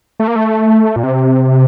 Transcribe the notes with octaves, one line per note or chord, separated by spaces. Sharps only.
A3
A#3
A3
A#2
C3